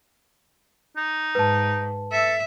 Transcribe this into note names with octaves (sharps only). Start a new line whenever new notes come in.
D#4
G#2 B4 A5
A4 E5